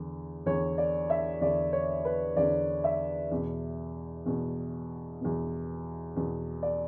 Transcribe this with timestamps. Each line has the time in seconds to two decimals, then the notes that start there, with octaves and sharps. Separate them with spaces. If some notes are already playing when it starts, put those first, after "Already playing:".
Already playing: E2 D3
0.46 E2 D3 C#5
0.78 D5
1.10 E5
1.41 E2 D3 D5
1.73 C#5
2.05 B4
2.36 E2 D3 D5
2.84 E5
3.31 E2 B2
4.25 E2 B2
5.21 E2 B2
6.16 E2 B2
6.63 D5